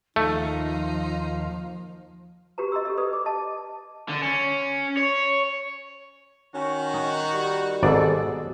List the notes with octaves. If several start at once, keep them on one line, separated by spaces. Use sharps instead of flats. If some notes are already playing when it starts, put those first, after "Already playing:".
D#2 F3 A3 D#4 F5
F#4 G4 B4 A#5
D#5 A#5 C6 E6
G4 A4 D#5
B4 D5 D#6
D6
D#5 A5
D3
C#4
C#5
D#3 C#4 F#4
D#4
G3
G#1 G#2 B2 G#4 A4 D5